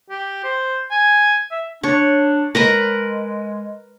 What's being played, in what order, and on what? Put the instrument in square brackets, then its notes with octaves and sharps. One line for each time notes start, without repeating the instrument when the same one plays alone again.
[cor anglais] G4
C5
G#5
E5
[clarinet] D4 [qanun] C#5
[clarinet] G#3 [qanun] A#4 B4 A#5